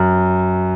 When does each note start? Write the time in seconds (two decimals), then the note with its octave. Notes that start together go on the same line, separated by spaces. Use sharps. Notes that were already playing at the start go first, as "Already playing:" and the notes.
Already playing: F#2